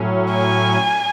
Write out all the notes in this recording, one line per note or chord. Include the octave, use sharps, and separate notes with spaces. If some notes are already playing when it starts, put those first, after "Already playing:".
Already playing: A2 F#3 C#4
G#5